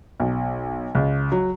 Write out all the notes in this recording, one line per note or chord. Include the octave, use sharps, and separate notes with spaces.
B1
C#2
F#3